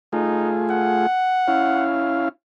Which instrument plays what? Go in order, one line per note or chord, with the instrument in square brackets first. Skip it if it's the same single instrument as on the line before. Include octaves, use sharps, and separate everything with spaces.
[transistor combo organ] A3 F4 G#4 [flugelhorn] D#4
[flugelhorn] F#5
[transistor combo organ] C#4 E4 F5